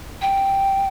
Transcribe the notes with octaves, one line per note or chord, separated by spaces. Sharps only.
G5